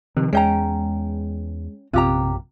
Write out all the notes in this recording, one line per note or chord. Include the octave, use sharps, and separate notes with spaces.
C3 D#3 F3
E2 G#3 C#4 G5 A#5
A#1 F#2 C3 F4 G4 A#5